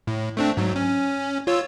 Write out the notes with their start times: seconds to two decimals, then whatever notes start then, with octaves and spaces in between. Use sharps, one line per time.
0.07 A2
0.37 A3 C4 D4
0.57 G#2 F#3
0.76 C#4
1.47 F4 C#5 E6